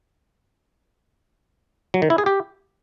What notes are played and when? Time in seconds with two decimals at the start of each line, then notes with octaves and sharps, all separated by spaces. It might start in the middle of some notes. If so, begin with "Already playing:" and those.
1.94 F#3
2.02 D#3
2.10 E4
2.18 G#4
2.26 G4